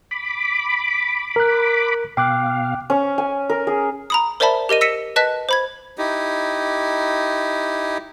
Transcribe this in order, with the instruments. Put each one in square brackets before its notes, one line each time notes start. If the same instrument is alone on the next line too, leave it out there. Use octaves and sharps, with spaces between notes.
[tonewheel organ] B5 D6
[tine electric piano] A#4 F#6
[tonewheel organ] B2 F5 [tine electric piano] G5 D6 F#6
[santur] C#4
G#5
A#4
G#4
[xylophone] A#5 B5 D#6
A#4 C5 D5 E5 A5 B5
G4 A#4 D#5 D#7
E6 A#6 B6 C#7 D#7 E7
B4 D#5 A5 F#6 B6
C5 B5 G#6
[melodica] D#4 E4 G4